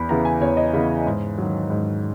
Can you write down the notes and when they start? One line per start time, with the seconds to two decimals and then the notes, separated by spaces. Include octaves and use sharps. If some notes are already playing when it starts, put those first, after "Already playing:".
Already playing: E2 B5
0.09 C#3 E3 B3 A#5
0.25 G#5
0.41 E2 C#5
0.57 D#5
0.73 C#3 E3 B3 B5
1.06 G#2
1.38 D#3 F#3
1.70 G#2